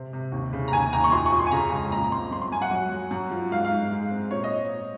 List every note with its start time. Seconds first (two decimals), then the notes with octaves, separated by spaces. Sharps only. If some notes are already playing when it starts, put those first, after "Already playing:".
Already playing: C3 C4
0.13 C3
0.32 D#2
0.53 C#3
0.68 A#5
0.72 D#2 G#5
0.93 D#2 A#5
1.04 C#6
1.12 F2 C6
1.26 C#6
1.32 F2
1.39 C6
1.47 G#5
1.51 C#3 A#5
1.72 C#2
1.92 A#2 A#5
2.04 A#5
2.12 C4 C6
2.31 F#2 C6
2.42 C6
2.52 F#2 G#5
2.62 F#5
2.71 F#3
2.92 F#3
3.11 F#2
3.31 F3
3.51 G#2 F5
3.64 F5
3.71 G#2
3.92 G#3
4.10 C4
4.31 A#2 C#5
4.44 D#5